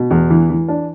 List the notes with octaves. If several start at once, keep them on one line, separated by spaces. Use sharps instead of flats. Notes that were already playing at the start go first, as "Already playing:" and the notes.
Already playing: B2
E2
E3
E3
D4